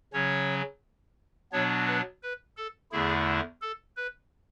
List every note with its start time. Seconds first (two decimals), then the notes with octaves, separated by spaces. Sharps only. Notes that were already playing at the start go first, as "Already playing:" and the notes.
0.13 C#3 F#3 C#4 C#5
1.52 B2 F#3 B3 D4 C#5
1.87 B4
2.23 B4
2.57 A4
2.92 E2 D3 A3 E4 G#4
3.61 A4
3.97 B4